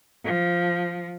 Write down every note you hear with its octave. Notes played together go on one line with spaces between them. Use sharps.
F3